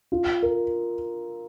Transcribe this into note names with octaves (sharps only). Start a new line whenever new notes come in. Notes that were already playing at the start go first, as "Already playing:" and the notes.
F4
A#4